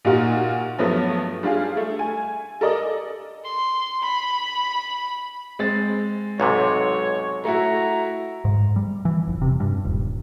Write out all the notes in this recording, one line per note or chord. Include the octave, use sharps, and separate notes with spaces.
A#2 D#4 F4 F#4
G2 F3 F#3 A3 B3
G3 D4 F4 G#4 F5
A3
G#5
A4 A#4 D5 D#5
C6
B5
G#3 C4 A6
B1 G#2 C3 C#5
A3 E4 F#4 A#5
G#2
G3
E3
F1
C3
G2
D#1